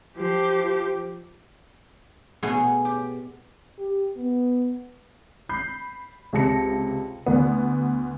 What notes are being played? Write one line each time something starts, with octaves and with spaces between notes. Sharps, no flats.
F3 G4
B2 A3 B3 G#4
G4
G4
B3
B5 G6 C7
C#2 C3 A5 A#6 C#7
D2 B3